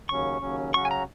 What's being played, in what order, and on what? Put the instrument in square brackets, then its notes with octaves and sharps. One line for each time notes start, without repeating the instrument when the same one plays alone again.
[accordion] D#2 C#3 F#3 C#4 [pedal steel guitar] C#6
[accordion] D#2 C#3 F#3 C#4
[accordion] C#3 F#3 C#4 F#4 [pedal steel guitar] C#6
[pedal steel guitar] G#5
A#5